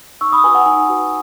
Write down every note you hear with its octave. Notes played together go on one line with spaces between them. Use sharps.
D#4 C#6 E6
B5 D#6
F#4 B4 G#5
F#5
D#4 G#5
F#4 B4